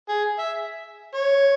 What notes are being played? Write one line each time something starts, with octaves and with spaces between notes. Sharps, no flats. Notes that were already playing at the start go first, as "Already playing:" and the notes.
G#4
E5
C#5